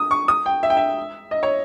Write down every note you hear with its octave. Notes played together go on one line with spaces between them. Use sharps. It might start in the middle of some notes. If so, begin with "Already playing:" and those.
Already playing: D#6
C#6
D#6
G5
E5
G5
E5
D#5
C#5